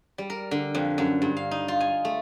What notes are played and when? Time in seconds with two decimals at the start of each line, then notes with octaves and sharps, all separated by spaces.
0.18 G3
0.30 A#4
0.51 D3
0.75 F2
0.98 F#2
1.22 G2
1.37 F5
1.51 D#4
1.68 F4
1.80 G#5
2.05 A3